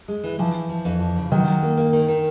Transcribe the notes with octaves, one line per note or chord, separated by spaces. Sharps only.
G#3
E3
E3 F3
F3
F3
F2
F3
C#3
D#3 F#3
F#3
A#3
A#3
D#3
D#3